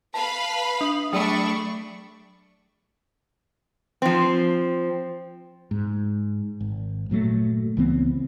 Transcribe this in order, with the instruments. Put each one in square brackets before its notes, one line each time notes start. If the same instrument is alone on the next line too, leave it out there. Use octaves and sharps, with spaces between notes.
[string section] B4 F5 B5 [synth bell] A5
[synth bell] D4 D#6 F#7
[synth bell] F#3 D5 B5 [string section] A3 D4 C#6
[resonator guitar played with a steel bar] F3 C4
[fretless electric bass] G#2
G#1
G1 A#2 F#3 A3
C#2 E3 B3 C4